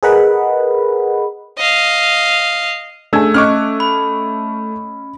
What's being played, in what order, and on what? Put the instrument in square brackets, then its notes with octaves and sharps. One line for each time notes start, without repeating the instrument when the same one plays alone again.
[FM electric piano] G#4 A#4 B4 D#5 F#5 B5
[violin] D#5 F5
[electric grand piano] A3 E6 G#6 [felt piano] D4 G#4 G#5
[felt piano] C#4 D#5 F#6 [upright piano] C#6 D6 F6
[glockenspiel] B5